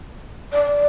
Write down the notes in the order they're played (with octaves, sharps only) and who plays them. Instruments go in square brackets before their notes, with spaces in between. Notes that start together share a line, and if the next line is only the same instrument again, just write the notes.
[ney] D5